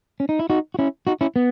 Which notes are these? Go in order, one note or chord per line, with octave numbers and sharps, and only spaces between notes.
C#4
D#4
E4
D#4 F#4
F#4
C#4 E4
D#4 F#4
C#4 E4
B3